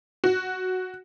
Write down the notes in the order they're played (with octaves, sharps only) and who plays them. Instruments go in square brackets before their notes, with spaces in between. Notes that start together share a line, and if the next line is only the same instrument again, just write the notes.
[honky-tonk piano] F#4